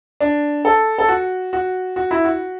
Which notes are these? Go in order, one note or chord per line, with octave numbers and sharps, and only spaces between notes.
D4
A4
A4
F#4
F#4
F#4
E4
F#4